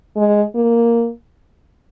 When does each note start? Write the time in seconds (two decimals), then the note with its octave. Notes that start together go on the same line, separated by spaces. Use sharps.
0.16 G#3
0.55 A#3